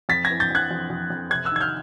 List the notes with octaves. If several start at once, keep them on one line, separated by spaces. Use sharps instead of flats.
F2 A6 B6
G#6 A#6
E3
G6 A6
F2 F#6 G#6
F2
F2
F2
C3 F#6 G#6
E6 F#6
D#3 G#6
F6 G6